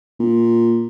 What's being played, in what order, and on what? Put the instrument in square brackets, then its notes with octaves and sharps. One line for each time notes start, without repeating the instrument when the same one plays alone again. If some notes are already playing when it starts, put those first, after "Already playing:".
[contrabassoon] A#2